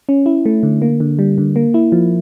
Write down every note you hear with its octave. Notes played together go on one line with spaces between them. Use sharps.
C#4
E4
A3
D3
A#3
D3
G3
D3
A#3
E4
F3